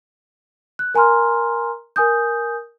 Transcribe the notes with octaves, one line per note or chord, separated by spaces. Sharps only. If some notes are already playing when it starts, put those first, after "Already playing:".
F#6
A#4 G#5 A#5 C6 F6
A#4 G#5 D#6 G6